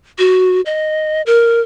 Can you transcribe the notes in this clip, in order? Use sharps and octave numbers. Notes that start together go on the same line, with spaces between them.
F#4
D#5
A#4